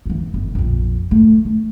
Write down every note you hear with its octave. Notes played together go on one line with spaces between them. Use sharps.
E3 F3
G1
A#1 F2
A3
A3